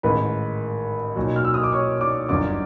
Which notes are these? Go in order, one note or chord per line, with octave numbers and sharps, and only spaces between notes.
A1 G#2 D#3 B4 B5
B1 A#2 F#3
F6
E6
D#6
D6
C#5 C#6
D5 D6
G1 F#2 D3 D5 D6